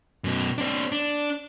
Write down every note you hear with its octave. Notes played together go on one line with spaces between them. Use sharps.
F#2 B2
C4 D4
D4